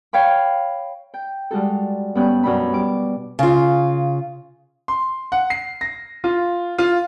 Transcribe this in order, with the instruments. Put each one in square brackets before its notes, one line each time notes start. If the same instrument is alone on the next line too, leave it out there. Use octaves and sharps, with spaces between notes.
[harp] C#5 F5 G5 B5
G5
G3 G#3 F#4 A4
G2 B3 C#4 G5 F#6
F#2 B2 D4 B5
G3 D6
[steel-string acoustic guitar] C#3 F4
[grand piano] C6
F#5
C7
A#6
F4
F4